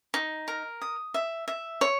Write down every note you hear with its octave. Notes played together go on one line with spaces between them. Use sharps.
D#4
A#4
D#6
E5
E5
C#5